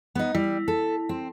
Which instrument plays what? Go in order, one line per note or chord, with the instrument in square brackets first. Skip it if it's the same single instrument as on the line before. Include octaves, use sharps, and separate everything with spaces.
[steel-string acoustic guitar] B3 D#4
[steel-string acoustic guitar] G3 [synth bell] E4
[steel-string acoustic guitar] A4
C4